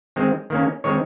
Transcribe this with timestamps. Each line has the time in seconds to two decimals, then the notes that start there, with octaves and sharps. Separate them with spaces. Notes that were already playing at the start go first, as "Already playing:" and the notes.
0.16 D#3 G#3 C4
0.50 D#3 A#3 C#4
0.84 D#3 G#3 C4 C#5